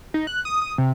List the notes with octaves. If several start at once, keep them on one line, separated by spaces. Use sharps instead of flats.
D#4
F#6
D#6
D#6
C3